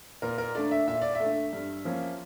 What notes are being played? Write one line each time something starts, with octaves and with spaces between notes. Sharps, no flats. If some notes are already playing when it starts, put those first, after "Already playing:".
A#2 A#4
A#4
A3 D4 D5
E5
A#2 E5
D5
E5
A3 D4
G2
F3 A#3 C#4